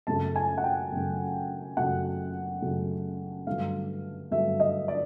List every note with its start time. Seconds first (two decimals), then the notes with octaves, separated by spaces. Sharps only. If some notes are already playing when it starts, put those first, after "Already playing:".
0.07 F#2 C#3 F#3 A3 A5
0.36 G#5
0.58 F#5
0.64 G5
0.92 F#2 C#3 F#3 A3
1.77 F#2 C#3 F#3 A3 F#5
2.62 F#2 C#3 F#3 A3
3.47 G2 D3 F#3 A3 F5
4.31 G2 D3 F#3 A3 E5
4.60 D#5
4.88 D5